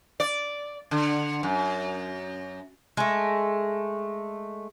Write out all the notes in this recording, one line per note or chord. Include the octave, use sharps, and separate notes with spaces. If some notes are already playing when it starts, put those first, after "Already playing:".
D5
D3
F#2
G#3 A3